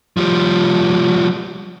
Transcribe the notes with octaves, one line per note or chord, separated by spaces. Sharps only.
F3 G3